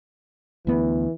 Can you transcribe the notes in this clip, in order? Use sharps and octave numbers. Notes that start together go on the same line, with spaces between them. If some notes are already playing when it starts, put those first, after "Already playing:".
D2 E3 B3